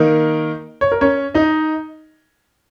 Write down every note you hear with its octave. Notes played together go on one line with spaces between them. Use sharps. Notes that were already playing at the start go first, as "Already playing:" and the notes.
Already playing: D#3 A#3 D#4 A#4
C#5
A#4
C#4 C#5
D#4 D#5